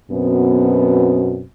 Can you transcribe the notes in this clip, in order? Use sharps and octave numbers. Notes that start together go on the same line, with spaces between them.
F#2 B2 B3 C4